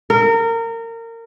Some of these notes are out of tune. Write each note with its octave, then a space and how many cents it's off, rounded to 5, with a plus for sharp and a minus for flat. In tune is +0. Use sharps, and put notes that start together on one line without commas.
A#4 -25